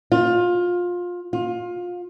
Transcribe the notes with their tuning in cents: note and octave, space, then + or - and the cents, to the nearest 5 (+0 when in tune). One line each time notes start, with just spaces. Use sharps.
F4 +20
F4 +25